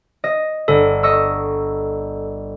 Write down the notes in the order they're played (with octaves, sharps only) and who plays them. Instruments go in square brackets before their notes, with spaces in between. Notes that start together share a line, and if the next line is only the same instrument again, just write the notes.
[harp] D#5
[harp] G1 [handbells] A4
[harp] D#5 C#6 E6